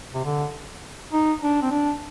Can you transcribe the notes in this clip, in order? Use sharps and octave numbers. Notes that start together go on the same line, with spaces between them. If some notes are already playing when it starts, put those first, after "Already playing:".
C3
D3
D#4
D4
C4
D4